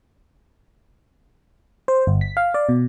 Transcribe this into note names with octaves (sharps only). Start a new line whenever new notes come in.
C5
G1
B6
F5
D5
B2